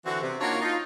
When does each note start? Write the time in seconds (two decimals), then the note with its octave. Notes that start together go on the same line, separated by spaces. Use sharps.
0.06 D3 E3 C4 F#4
0.22 C3
0.41 A#3 D4 D#4 F4 F#4 C#5
0.61 D#4 F4